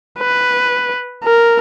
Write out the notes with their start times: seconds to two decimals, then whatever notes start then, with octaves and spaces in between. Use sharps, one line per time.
0.19 B4
1.24 A#4